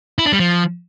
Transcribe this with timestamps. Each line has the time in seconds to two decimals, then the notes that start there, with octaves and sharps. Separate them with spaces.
0.18 E4
0.25 D4
0.32 G3
0.39 F3